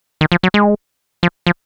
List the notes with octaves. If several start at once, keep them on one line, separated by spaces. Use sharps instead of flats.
D#3
F3
F#3
G#3
F3
F3